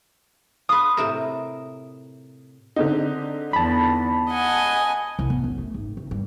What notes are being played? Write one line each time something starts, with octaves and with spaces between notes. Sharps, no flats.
F4 B4 D#6
A2 C3 A#4 E7
D3 C4 D#4
E2 A5 B5
D#5 F#5 G#5
C2
B3
F#2
A3
G#1
F#1
G2